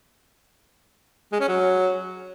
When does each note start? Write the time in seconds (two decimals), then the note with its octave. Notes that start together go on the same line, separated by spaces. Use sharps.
1.32 G#3
1.40 C#4
1.48 F#3